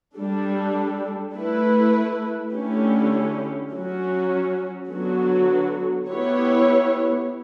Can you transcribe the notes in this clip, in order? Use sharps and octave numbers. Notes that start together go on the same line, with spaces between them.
G3 D4 A4
A3 E4 B4
D3 A3 C#4 E4 G4
F#3 C#4 F#4
D3 F#3 B3 F#4
B3 E4 G4 C#5